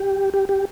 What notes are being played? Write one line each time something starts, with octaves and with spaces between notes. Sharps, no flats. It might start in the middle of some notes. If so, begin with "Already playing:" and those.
Already playing: G4
G4
G4